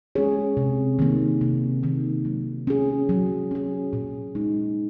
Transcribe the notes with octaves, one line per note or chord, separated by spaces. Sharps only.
G#3 C#4 G#4 C#5
C3
D#3 A#3
C3
D#3 A#3
F#3
C#4 G#4
F#3
C#4 G#4
A#2
G#3 D#4